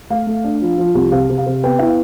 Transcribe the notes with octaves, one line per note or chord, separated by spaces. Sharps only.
A3 F5
A3
D4
F3
F3
C2
C3 F5
C3
F5
C3
B3 G5
E4 E5
F5